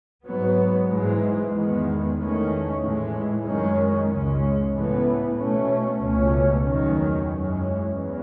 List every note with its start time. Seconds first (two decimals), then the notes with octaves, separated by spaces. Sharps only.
0.24 G#2 F#3 B3
0.88 G#2 E3 G#3
1.52 E2 D#3 G#3 B3
2.17 E2 D#3 A3 C#4
2.80 A2 E3 G#3
3.45 F#2 D#3 G#3 C#4
4.09 C#2 C#3 G#3 C#4
4.73 A2 E3 B3
5.37 B2 A3 C#4
6.01 C#2 B2 A3 C#4
6.64 E2 D#3 F#3 C#4
7.29 F#2 E3 G#3 C#4
7.93 E2